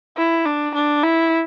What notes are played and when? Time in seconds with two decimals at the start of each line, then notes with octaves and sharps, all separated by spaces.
0.17 E4
0.46 D4
0.75 D4
1.03 E4